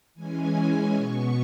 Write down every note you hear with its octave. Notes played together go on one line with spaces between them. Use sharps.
E3 G#3 C#4 G#5
B2 B3 C#6